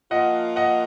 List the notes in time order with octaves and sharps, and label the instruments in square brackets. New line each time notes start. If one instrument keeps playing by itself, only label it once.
[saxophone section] F3 A#3 F4 [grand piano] D#5 F#5
[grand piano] D#5 F#5